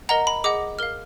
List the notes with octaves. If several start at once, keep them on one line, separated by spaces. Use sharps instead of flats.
A#4 D#5 F#5 A#5
B5
G#4 D#5 F#5 D6
A#4 F5 F6